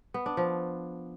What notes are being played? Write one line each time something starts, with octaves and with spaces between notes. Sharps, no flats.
B3
D4
F3